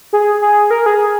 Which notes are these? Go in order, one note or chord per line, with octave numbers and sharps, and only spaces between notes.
G#4
G#4
A#4
G#4